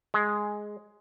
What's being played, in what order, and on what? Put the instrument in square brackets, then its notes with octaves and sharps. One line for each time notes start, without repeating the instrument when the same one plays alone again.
[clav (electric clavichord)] G#3